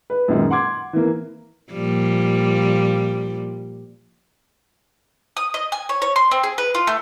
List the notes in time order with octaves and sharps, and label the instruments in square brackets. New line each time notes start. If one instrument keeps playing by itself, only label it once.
[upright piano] B4
F#2 A#2 D#3 G#3
F#5 C6 D6 G#6
E3 A#3
[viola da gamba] A#2 F3 G3
[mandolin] D#6
D#5
G#5
C#5
C#5
C6
C4
G#4
B4
F4
A3